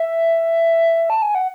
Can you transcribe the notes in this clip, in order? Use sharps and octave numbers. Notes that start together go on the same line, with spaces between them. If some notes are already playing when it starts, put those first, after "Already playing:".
Already playing: E5
A5
G#5
F#5